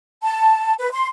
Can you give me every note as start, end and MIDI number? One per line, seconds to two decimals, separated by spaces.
0.23 0.74 81
0.79 0.89 71
0.92 1.07 84